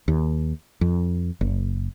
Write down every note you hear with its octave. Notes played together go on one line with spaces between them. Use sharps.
D#2
F2
F#1